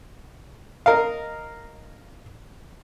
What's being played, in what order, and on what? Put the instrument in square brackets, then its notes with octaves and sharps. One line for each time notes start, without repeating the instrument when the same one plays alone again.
[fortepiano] A#4 D#5 F5